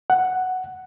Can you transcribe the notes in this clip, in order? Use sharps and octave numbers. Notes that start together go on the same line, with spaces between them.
F#5